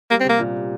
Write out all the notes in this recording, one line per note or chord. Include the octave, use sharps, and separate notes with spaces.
G3 A#3
C4
C3 A#3
A#2